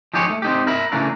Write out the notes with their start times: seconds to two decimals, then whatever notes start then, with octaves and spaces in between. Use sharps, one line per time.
0.14 F3 D#4 F4 G4 G#4 C#5
0.30 A3
0.42 C4 D#4 G4
0.67 A#4 E5 B5
0.92 C#3 E3 A3 A#3 D4 A#4